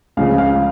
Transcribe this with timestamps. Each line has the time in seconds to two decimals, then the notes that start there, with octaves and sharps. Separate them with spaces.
0.17 C#2 C#3 F3 G#3 F5
0.38 F5